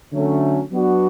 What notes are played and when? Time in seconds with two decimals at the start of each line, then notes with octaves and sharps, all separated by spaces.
0.12 D3 F#3 A3 C#4
0.71 F#3 B3 D4 F#4